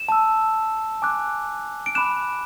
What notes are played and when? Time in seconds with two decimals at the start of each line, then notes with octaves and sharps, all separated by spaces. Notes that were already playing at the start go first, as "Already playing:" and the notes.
Already playing: E7
0.09 A5 E6
1.02 G#5 D6 F#6
1.86 D7
1.95 B5 D6 F#6 E7